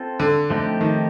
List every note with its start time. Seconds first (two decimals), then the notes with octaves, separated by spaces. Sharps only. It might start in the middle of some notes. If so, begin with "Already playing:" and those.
Already playing: C4 F4 A4
0.20 D3
0.50 F3 A3 C4 D#4 G4
0.81 D#3